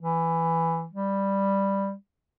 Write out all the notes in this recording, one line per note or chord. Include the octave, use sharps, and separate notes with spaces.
E3
G3